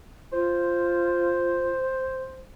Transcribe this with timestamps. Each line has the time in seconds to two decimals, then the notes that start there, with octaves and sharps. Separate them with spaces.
0.32 F4 C5